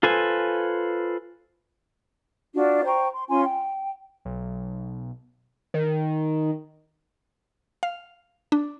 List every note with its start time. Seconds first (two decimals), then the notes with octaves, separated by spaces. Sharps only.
0.03 F4 A4 B4 C5 G#5
2.55 D4 F4 F#4 D5
2.85 C5 G5 A#5 C#6
3.12 C6
3.29 C#4 F4 G#5 C6
3.43 G5
4.25 B1
5.74 D#3
7.83 F5
8.52 D4